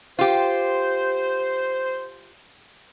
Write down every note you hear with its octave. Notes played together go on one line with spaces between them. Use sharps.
F4 G4 C5